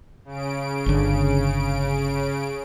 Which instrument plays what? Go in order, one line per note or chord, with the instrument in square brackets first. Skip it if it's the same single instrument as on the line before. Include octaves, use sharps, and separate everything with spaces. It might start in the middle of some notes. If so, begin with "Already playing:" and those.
[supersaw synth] C#3 D7
[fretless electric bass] G1 D3